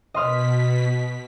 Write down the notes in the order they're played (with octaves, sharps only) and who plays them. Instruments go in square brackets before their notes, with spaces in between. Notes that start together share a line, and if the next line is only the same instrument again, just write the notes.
[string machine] B2 B6 [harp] D#5 C6 F6